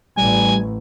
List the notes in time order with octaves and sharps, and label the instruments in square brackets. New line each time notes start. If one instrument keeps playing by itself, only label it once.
[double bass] A1 [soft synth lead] G3 [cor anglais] G#5